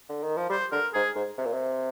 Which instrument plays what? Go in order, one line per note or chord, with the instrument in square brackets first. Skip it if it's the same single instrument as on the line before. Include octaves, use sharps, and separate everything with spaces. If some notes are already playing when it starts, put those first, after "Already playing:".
[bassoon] D3
D#3
F3
[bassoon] G3 [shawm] C5
[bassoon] D3 [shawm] A#4
[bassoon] G#2 [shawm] G#4
[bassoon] G#2
C3
A#2
C3